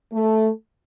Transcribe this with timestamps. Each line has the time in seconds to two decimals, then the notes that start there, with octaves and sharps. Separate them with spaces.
0.13 A3